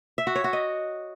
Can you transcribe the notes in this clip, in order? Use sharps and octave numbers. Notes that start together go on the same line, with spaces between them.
E5
F#4
C#5
F#4
D#5